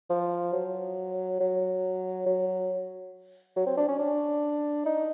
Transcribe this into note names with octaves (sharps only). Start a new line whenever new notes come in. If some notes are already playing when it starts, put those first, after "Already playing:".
F3
F#3
F#3
F#3
F#3
C4
D4
C#4
D4
D#4